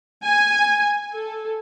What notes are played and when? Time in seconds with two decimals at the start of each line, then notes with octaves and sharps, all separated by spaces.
0.23 G#5
1.14 A4